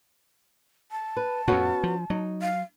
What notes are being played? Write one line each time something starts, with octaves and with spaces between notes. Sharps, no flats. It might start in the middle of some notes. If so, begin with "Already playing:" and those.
A5
B4
F2 A2 B3 C#4 F#4
F3
F#3 D#4
F5